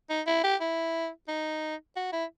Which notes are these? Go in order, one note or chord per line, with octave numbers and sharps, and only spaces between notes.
D#4
E4
G4
E4
D#4
F#4
E4